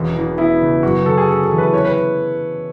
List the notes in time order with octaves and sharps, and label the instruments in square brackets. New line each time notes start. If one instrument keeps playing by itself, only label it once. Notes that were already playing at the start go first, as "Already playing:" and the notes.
Already playing: [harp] E1 C#4
E2
[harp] B3 [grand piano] E4
[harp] C#3
[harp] F#2 [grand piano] F#4
[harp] D3 [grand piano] A4
[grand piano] G#4
[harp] C#4 [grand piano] A4
[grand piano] A4
[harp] E3
[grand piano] B4
[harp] C#4 [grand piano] C#5
[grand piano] B4